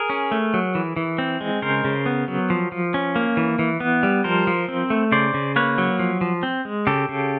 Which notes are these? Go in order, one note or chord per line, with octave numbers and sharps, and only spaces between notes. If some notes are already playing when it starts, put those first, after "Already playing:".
Already playing: G#4 A#4
C#4
A3
F#3
E3
E3
C4
G#3
C#3 A#4 C5
C#3
B3
F#3
F3
F3
C#4
A#3
E3
E3
B3
G3
F3 A#4 C5
F3
C4
A3
C#3 C5 D5
C#3
A#3 B4 C#5
F#3
F3
F3
C4
G#3
C#3 G4 A4
C#3